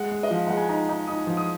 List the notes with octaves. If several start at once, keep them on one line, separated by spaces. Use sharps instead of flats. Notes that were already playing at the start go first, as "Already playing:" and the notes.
Already playing: G#3 F#5
G#3
D#5
F3 F5
G#3 F#5
G#5
D#4 A#5
D#4
D#4 D#6
F3
D#6